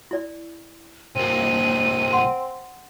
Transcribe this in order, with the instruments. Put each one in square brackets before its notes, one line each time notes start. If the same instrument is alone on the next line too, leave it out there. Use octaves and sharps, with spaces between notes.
[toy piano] E4 D5
[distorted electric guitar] C2 A#3 [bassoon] C4 [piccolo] D#7
[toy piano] F#5 C6